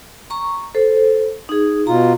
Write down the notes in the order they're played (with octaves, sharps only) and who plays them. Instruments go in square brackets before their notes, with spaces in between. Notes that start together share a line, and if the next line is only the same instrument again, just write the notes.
[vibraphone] A#5 C#6
A4 C5
D#4 G#4
[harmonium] B2 F4 [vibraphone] A#5